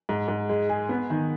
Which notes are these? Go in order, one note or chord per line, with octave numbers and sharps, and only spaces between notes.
G#2
G#2
G#3
G#4
B3
D#3